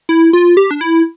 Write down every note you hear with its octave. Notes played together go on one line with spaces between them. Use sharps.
E4
F4
G4
D4
E4